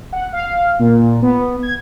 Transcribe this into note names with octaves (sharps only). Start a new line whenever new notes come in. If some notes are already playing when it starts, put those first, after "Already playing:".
F#5
F5
A#2
B3
G#6